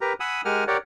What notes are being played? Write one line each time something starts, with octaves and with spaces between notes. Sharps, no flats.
G4 A#4 B4 A#5
F#5 G#5 B5 D#6 E6
G#3 G4 A#4 F#5 G#5 F6
G4 A#4 C#5 D5 F#5